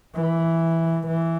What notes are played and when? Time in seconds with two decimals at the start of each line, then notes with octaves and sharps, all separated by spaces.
0.15 E3
1.07 E3